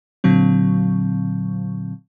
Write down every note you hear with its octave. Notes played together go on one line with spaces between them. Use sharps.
A#2 D3 F#3 C4